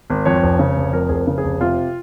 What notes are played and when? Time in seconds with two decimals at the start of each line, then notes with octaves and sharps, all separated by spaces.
0.10 G#1
0.25 F2 C#5
0.42 F1
0.59 C#3
0.77 F1
0.93 F2 A#4
1.09 F1 G#4
1.16 A#4
1.27 C#3
1.38 G#4
1.44 F1
1.60 C3 F4